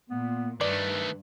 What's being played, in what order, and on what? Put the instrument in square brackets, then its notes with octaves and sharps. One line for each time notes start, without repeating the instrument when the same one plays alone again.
[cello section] A#2 [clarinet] B3
[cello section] G2 [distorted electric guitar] D#3 A3 [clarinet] B4 [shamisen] D5